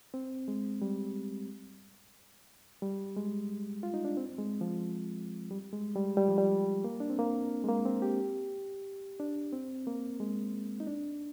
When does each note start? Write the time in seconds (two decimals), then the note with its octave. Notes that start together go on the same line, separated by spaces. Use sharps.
0.14 C4
0.48 G#3
0.82 G3
2.82 G3
3.16 G#3
3.83 F4
3.94 D#4
4.05 D4
4.17 C4
4.38 G#3
4.61 F3
5.51 G3
5.73 G#3
5.96 G3
6.17 G3
6.28 F3
6.38 G3
6.84 A#3
7.00 D4
7.10 C4
7.19 A#3
7.64 G#3
7.69 A#3
7.85 C4
8.02 G4
9.20 D4
9.53 C4
9.87 A#3
10.20 G#3
10.80 D#4
10.87 D4